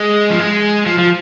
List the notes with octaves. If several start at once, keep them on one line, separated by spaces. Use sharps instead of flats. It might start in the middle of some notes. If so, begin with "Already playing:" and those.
Already playing: G#3
F3
G#3
F3
F3